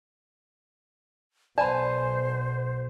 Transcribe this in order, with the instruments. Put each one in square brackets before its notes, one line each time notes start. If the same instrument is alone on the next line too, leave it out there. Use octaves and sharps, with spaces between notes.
[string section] B1 [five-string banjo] B3 G#5 A5 [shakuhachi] C5 [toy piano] D5 B5